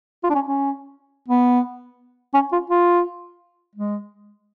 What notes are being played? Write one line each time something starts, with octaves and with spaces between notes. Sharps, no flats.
F4
D4
C#4
C#4
B3
C#4
F4
F4
G#3